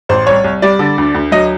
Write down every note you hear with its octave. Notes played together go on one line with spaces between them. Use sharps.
A1 C5
C2 C#5
C2
G3 D5
D3
D2
D2
F#3 D#5